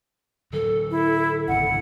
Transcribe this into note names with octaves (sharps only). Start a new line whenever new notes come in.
D3 F#3 A4
E4
G#1 C#2 D3 F#5